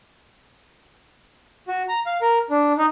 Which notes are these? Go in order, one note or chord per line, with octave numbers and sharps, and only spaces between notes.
F#4
A#5
F5
A#4
D4
D#4